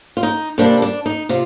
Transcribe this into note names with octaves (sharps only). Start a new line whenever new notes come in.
F4
D#4
C3 G3 A#3 D4
D4
D#4
C3 F4